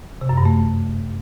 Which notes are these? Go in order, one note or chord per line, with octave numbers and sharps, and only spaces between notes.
C3
F#2
G2
A3